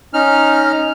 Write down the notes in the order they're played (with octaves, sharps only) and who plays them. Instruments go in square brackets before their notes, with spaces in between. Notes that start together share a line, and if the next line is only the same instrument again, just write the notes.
[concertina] C#4 D#4 F6